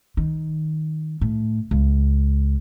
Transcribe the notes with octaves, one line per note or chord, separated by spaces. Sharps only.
D#3
A2
C#2